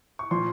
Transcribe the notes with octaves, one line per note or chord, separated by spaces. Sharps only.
C#6
A#2 F3 C6